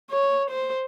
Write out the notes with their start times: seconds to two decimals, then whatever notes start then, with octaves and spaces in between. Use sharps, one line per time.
0.10 C#5
0.50 C5